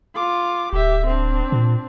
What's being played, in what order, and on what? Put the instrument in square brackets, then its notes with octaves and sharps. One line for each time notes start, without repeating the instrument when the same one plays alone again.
[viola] F4 D6
[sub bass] D1 [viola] G4 E5
[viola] C4 D4
[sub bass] A#2